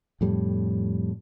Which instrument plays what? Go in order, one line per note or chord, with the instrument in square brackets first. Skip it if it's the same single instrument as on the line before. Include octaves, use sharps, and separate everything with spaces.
[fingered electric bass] F2 A2 G3